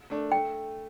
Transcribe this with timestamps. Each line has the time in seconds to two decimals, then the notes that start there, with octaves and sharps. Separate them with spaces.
0.10 A3 D4
0.32 A3 G5